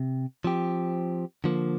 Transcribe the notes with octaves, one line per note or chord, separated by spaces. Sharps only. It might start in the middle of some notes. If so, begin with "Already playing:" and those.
Already playing: C3
F3 C4 G4
D3 F3 A#3